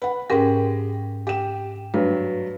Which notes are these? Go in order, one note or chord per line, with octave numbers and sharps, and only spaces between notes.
B4 F#5
G#2 C#4 G4 G#4 A#4
G4 E7
G2 F#3 B4